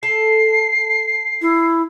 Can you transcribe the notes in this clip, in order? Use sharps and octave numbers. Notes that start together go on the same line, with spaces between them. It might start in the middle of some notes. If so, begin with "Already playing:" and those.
A4 C7
E4